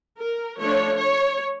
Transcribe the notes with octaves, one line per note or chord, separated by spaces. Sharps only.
A#4
F3 A3 D4 C#5
C#5